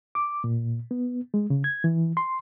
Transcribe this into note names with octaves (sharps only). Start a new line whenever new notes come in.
D6
A#2
B3
G#3
C#3
G#6
E3
C6